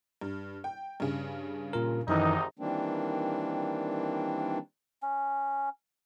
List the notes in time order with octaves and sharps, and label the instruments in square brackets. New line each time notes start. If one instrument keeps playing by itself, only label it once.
[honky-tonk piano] G2
G5
G2 C#3
[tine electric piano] A#2 F4 A#4
[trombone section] G#1 C3 D#4 [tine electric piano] F#2 D#3 E3 [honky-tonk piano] D#5
[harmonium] D#3 E3 G3 A#3 C4 D4
[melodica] C#4